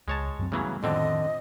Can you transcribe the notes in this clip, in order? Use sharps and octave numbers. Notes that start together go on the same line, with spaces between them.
C#2 G#3 C#5 A5
F#2 F#3 C4
C#3 E3 F#3 G3 A3 B3
F2 A2 D3 D#3 C4 D4 D#5